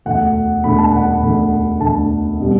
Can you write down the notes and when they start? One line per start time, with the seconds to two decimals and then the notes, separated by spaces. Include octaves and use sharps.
0.05 E1 D2 D3 F#5
0.64 E1 D2 D3 B5
0.78 A5
0.92 F#5
1.07 F#5
1.22 E1 D2 D3
1.80 E1 D2 D3 A5
2.40 B2 G3 B3